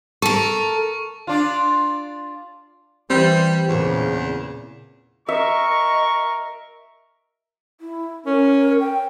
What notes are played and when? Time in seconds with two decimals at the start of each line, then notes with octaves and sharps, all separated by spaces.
0.22 A4 A#4 C#6
1.27 D4 F4
3.10 E3 G3 C4
3.69 E2 A#2 C#3
5.29 A#4 D#5 E5 C#6
7.81 E4
8.26 C#4 A#4
8.80 G5